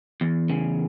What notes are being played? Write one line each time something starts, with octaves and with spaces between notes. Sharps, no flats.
E2
C#3